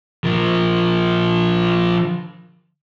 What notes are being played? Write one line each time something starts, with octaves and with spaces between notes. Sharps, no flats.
F3 A#4